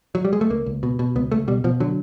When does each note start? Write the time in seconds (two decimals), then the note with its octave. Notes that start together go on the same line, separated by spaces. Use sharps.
0.15 F#3
0.25 G3
0.33 G#3
0.41 A3
0.50 C#2 A#3
0.66 C#2
0.83 B2
0.99 B2
1.16 C#2 B3
1.32 C#2 A3
1.48 B2 G3
1.64 B2 F3
1.80 D3 F#3